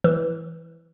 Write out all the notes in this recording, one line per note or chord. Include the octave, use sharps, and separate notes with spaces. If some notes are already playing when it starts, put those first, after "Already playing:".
E3